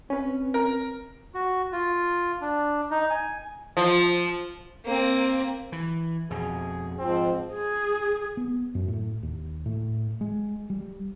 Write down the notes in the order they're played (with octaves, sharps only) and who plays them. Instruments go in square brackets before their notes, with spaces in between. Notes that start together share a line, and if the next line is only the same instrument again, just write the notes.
[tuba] C4 [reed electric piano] C#4 B4
[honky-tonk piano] A#4
[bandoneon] F#4
F4
D4
D#4
G#5
[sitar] F3
[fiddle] A#3 C4
[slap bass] E3
[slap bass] F2 B2 [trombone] G#4
[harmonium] G#2 F3 [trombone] C4
[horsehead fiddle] G#4
[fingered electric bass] B3
F#2
A2
D#2
A2
G#3
G3